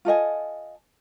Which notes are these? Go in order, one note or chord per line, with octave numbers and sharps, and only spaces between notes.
F4 A4 D#5 G#5